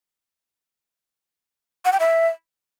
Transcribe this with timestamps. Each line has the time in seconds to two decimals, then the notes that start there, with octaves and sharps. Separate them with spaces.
1.85 F#5
1.92 G5
2.00 E5